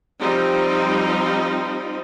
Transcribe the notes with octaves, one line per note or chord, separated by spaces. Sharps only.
F3 G3 C4 D#4